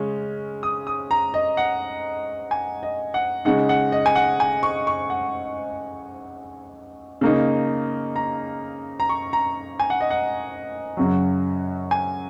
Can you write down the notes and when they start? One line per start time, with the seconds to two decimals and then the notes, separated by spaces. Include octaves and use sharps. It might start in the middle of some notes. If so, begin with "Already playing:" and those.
Already playing: C#3 G#3 C#4
0.63 D#6
0.87 D#6
1.11 A#5
1.34 D#5
1.57 F#5
2.51 G#5
2.83 D#5
3.14 F#5
3.45 C#3 G#3 D#4 F#5
3.69 F#5
3.92 D#5
4.06 G#5
4.16 F#5
4.40 G#5
4.63 C#6
4.87 C#6
5.10 F#5
7.21 C#3 A#3 D#4
8.16 A#5
9.00 A#5
9.09 C#6
9.33 A#5
9.80 G#5
9.90 F#5
10.01 D#5
10.10 F#5
10.97 F#2 C#3 F#3
11.91 G#5